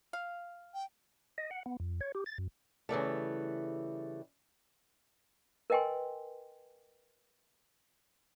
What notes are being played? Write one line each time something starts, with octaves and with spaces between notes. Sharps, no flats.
F5
G5
D#5
F#5
B3
F2
C#5
G4
A6
F#2
C#3 E3 G3 A3
A#4 B4 D#5 G5 G#5 C6